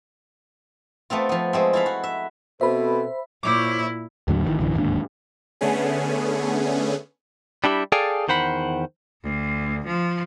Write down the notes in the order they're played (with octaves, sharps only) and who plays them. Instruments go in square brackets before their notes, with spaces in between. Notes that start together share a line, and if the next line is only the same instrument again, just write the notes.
[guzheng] A3 B3 C4 F4
F3 B3
G#3 A3 C4
E4 A4 F5 B5
F#4
E5
[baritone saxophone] B2 [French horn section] C4 A4 B4 [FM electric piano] C5 B5 [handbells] E5
[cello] A#2 E4 [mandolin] C5 C#5 D6
[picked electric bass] D#2 A2 D3 F#3
A1 G2 D#3 E3
A#1 F#2 D3 E3
D1 D#2 G#2 D4
[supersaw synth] D3 A3 B3 C#4 G#4
[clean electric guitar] G3 D4 E4 G4
G#4 A4 D5 F5 G5 G#5
E2 D#3 C5 F#5 B5
[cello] D2
F3